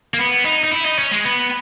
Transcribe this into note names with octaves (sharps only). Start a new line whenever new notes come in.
A#3
B3
D#4
D#4
E4
D#4
C#4
G#3
B3